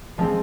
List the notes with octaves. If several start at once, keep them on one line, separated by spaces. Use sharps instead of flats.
F3 G#3 C4